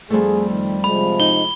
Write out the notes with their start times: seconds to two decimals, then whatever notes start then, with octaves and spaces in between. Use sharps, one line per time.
0.10 F2 G3 A3 G#4
0.50 D#3
0.84 C3 F3 G#3 B5
1.20 D#4 G7